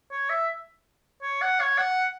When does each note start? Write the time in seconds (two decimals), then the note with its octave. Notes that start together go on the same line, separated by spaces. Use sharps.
0.11 C#5
0.30 E5
1.22 C#5
1.42 F#5
1.60 C#5
1.78 F#5